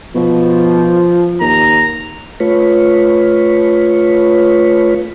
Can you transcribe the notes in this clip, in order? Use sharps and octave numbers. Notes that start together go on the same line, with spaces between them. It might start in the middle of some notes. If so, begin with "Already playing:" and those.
B2 F3
D#2 A#5
A3 F4 B4 C#5